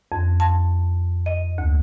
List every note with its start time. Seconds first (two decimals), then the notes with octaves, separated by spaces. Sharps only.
0.12 F2
0.40 A5
1.26 D#5
1.58 D2